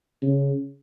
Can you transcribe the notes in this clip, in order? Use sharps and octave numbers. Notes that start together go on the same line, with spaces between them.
C#3